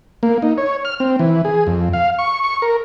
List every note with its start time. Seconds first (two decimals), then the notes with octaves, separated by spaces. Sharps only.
0.23 A#3
0.42 D#4
0.58 C#5
0.85 F6
1.00 C4
1.19 E3
1.45 G#4
1.67 F2
1.93 F5
2.19 C#6
2.44 C#6
2.62 A#4